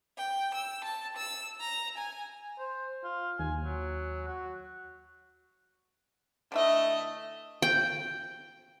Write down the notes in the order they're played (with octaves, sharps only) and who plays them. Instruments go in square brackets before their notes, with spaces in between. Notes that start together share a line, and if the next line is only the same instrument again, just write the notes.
[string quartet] G5
E6
A5
E6
A#5
G#5
[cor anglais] C5
F4
[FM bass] D#2 [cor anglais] G#5
[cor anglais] F#3
F#4
[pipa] D3 E3 E5 [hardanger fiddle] A3 D#5
[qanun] G5